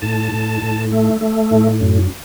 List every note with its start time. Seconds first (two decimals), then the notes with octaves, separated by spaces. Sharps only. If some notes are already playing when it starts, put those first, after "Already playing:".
0.02 A2 A5
0.32 A2
0.62 A2
0.92 A3
1.21 A3
1.51 A2
1.81 F#2